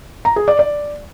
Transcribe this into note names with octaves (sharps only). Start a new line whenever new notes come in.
A#5
G#4
D5
D5